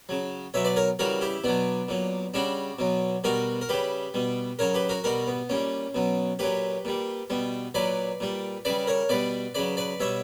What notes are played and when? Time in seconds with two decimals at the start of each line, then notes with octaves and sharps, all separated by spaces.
0.09 C#3 F#3
0.54 B2 F#3 C#5 E5
0.65 B4 D5
0.76 A#4 C#5
0.99 C#3 E3 G3 F#4 A#4
1.21 E4 G4
1.44 B2 F#3 B3 D4
1.89 A#2 F#3
2.34 C#3 G3 D4 F#4
2.79 B2 F#3
3.24 B2 G3 F#4 A#4
3.61 A#4
3.69 C#3 G3 G4 B4
4.14 B2 G3
4.59 C#3 F#3 A#4 C#5
4.74 G4 B4
4.89 F#4 A#4
5.04 B2 G3 F#4 A#4
5.27 B3
5.49 A#2 G3 C#4
5.95 B2 F#3
6.39 A#2 F#3 G4 B4
6.85 A#2 G3
7.30 B2 G3
7.75 A#2 F#3 B4 D5
8.20 A#2 G3
8.65 C#3 G3 B4 D5
8.87 A#4 C#5
9.09 B2 G3 B4 D5
9.55 C#3 F#3 B4 D5
9.77 B4 D5
10.00 B2 G3 C#5 E5